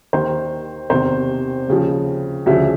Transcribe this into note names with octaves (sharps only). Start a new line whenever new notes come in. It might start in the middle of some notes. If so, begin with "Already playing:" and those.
D#2 D#3 C5
E2 C3 D#3 C5
D#2 C#3 F3
D2 C#3 F3 E5